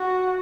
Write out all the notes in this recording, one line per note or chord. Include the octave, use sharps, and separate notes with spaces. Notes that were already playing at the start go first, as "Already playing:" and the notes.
Already playing: F#4